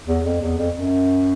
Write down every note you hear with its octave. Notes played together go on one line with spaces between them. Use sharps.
E2
F2
E2
F2
F#2